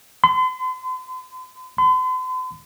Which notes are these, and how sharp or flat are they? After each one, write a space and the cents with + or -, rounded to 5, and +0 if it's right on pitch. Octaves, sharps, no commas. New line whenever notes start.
C6 -40
C6 -45